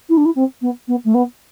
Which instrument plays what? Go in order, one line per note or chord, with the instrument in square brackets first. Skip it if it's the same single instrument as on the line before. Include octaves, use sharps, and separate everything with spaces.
[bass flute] E4
D4
E4
C4
B3
B3
A3
B3